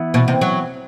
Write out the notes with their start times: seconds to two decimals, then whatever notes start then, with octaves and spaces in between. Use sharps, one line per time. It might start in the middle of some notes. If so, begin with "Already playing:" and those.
Already playing: E3 B3 E4
0.14 B2
0.28 C3
0.41 F#3